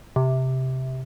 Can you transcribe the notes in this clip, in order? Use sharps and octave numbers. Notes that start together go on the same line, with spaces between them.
C3